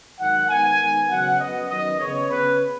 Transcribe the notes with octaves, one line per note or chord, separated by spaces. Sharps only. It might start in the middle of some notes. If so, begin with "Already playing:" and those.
G#2 D#3 F#3 F#5
G#2 D#3 B3 G#5
G#2 D#3 B3
C#3 F#3 B3 F#5
F#2 F#3 B3 D#5
F#2 D#3 F#3 B3 D#5
C#3 B3 C#5
C#3 B3 B4